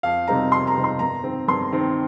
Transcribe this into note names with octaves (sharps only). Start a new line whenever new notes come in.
F2 F5
C3 G3 C4 D#4 A#5
F2 C6
A#5
C3 G3 C4 D#4
C6
G2 A#5
D#3 C4
G2 C6
D#3 C4